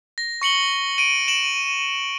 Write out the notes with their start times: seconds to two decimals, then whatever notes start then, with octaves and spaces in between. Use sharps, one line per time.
0.18 A#6
0.42 C#6 C#7 F#7 G7
0.98 D7 D#7
1.27 D7 E7 F#7